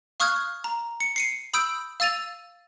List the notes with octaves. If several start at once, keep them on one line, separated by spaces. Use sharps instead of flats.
F5 C#6 D#6 F6 F#6 G#6
A#5
C#7
C7 C#7 D#7
B5 D#6 E6 G6 D7
F5 E6 A6 D#7 F7